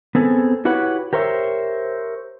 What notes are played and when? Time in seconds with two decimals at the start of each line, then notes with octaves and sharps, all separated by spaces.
0.15 B3 C4 G#4 A4
0.65 E4 F#4 G4 B4 C#5 F#5
1.13 G4 A#4 C5 C#5 E5